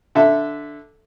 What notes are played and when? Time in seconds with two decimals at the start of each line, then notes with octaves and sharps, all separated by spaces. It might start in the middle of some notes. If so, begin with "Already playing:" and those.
0.15 D3 A4 E5